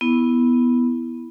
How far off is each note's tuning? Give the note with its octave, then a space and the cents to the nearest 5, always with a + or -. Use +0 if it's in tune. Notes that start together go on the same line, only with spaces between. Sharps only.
B3 +0 E4 -5